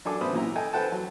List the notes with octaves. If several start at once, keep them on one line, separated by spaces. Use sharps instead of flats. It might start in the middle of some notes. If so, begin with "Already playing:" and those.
F#3 D4 A4 G#5 D6
A1 B3 C5 B5 D#6
A#2 F#3 E4 A#5
A4 D#5 G5 G#5
A4 B4 C5 F#5 G5 A5
F#3